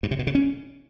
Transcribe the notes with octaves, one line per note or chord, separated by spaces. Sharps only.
G2
C3
B2
C#3
C#4